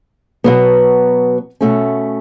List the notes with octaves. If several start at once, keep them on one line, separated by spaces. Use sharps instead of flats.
B2 F#3 B3
B2 A3 C#4